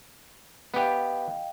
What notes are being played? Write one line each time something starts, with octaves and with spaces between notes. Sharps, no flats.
B3 G4 D#5 F5 G5